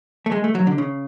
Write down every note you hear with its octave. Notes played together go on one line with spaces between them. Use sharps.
A3
G#3
A3
F#3
D3
C#3